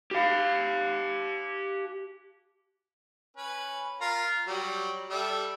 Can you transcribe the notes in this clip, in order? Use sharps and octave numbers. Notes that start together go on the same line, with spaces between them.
G4 F5
C#4 B4
F4 A#4
F#3 G3
G3 A4 E5